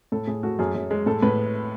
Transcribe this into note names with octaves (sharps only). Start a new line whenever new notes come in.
A2 A4
A2 G#4
A3 F#4
F#2 G#4
F#2
G#3
A2 A4
A2 B4